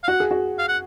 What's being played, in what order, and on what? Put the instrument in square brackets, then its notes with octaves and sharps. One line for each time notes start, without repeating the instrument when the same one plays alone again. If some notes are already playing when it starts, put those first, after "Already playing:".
[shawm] F5
[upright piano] F#4 [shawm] F#5
[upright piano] G#4
F#4
[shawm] F5
F#5